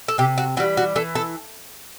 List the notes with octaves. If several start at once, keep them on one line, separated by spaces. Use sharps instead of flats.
A4
C3 G4
F#4
E3 G3 F#4
F#4
E3 A4
A4